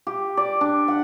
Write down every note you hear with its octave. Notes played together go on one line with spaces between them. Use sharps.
G4
D5
D4
F#5